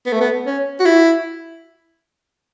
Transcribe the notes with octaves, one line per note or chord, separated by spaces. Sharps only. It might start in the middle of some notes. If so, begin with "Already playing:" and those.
B3
A3
B3
C#4
F#4
E4